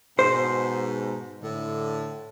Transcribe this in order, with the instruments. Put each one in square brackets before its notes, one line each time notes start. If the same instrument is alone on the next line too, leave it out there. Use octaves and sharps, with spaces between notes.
[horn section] G#2 B2 [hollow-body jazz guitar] C5
[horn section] A2 D3